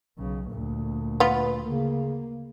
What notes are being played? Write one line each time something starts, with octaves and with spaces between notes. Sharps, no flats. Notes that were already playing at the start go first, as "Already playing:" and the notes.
B1 C#3
D2 A#2
B3 F4 B4
C#3 A#3